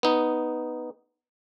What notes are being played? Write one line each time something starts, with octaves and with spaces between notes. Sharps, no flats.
B3 D#4